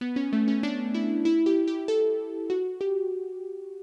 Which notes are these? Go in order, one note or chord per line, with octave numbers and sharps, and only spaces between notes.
B3
C#4
A3
C#4
D4
E4
E4
G4
G4
A4
F#4
G4